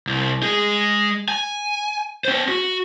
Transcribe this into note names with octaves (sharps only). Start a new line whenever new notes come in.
C2
G#3 G#4
G#5
C#4 C5
F#4